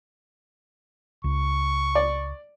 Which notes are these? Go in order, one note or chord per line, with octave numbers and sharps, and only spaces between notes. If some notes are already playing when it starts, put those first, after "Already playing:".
C#2 C#6
D5